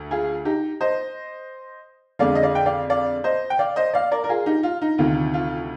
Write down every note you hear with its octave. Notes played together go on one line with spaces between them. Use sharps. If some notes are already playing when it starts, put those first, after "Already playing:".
Already playing: D2
F4 G#4
D#4 G4
C5 D#5
F2 D3 G#3 D5 F5
D#5
D5 F5
G5
D5 F5
D5 F5
C5 D#5
G5
D5 F5
C5 D#5
D5 F5
A#4 D5
A#4
F4 G#4
D#4 G4
F4
D#4
D2 C3 D#3 F4
F4